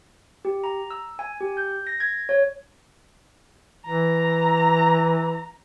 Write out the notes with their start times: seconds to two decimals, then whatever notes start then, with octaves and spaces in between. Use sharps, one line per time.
0.45 G4
0.64 A#5
0.91 E6
1.19 G#5
1.41 G4
1.57 G6
1.87 A#6
2.00 G#6
2.29 C#5
3.86 E3 A#5